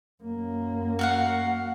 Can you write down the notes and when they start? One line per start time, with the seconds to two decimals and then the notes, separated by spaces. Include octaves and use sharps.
0.23 F#2 A#3
0.99 F#4 F5 F#5